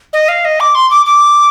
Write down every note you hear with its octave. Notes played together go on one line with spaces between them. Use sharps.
D#5
F5
D#5
D6
C6
D6
D6